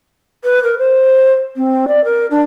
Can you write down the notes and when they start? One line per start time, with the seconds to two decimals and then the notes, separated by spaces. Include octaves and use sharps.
0.44 B4
0.63 A#4
0.79 C5
1.56 C4
1.88 D5
2.04 A#4
2.31 D4